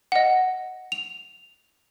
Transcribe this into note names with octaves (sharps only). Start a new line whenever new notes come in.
D#5 F#5
F7